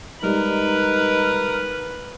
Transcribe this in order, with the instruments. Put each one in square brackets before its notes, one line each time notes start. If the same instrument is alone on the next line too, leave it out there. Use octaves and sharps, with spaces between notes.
[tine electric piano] G3 G#3 [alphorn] D#4 [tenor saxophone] A#4 [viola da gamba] B4